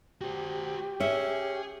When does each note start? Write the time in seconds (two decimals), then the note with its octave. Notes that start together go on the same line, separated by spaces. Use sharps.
0.21 F#4 G4 C5
1.01 C#4 G#4 E5